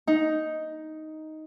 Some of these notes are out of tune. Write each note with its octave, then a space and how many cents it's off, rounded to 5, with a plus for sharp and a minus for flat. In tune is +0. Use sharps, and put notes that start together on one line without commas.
D#4 +5